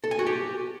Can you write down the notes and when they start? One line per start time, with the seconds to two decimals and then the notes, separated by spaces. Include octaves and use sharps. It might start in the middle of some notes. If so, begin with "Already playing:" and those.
0.04 A4
0.11 G#5
0.19 F#4
0.27 G4